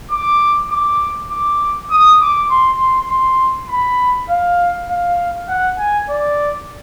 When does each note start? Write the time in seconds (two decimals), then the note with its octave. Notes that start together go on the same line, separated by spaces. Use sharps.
0.11 D6
0.71 D6
1.31 D6
1.91 D#6
2.20 D6
2.50 C6
2.80 C6
3.09 C6
3.69 B5
4.29 F5
4.89 F5
5.49 F#5
5.78 G#5
6.09 D5